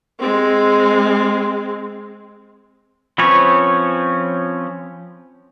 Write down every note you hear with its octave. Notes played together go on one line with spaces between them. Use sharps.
G#3 C4
F3 C4 C#4 B4 C#5